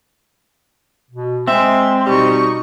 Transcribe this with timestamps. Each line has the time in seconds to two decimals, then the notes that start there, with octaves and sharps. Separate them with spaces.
1.11 B2
1.48 G#3 C4 E5
2.06 B2 G3 D#4 C#6